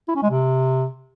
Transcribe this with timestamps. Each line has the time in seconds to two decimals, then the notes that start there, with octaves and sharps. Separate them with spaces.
0.08 E4
0.15 C#4
0.22 G#3
0.30 C3